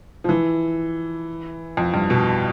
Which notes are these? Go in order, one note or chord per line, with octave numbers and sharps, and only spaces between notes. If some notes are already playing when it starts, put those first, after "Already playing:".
F3
E3
F2
G2
B2